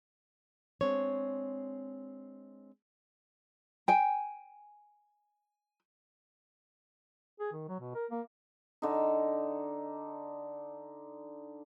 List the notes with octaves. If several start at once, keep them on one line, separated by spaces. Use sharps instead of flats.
G#3 C4 D4 C#5
G5 G#5
G#4
D#3
F#3
B2
A#4
A#3
D3 D#4